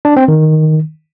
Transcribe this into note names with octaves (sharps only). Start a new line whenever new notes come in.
D4
C4
D#3